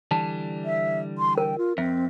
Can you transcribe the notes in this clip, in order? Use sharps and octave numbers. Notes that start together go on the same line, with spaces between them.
D3 E3 G3 A5
E5
C6
A#4 G5
F4
F2 C4 E5